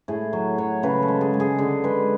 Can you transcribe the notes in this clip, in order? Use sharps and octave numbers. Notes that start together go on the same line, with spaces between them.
A2 G#4
F#3
F#3 C#5
C#3 B4
A4
G#3
G#4
G#3
G#4
D3 G#4
G#3 B4